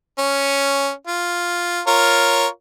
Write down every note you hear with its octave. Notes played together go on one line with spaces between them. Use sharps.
C#4
F4
F4 A#4 C#5